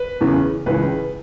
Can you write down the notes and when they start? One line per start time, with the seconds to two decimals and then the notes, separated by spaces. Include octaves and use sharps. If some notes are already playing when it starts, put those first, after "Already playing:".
Already playing: B4
0.21 E2 C#3 E3
0.66 C#2 C#3 E3 B4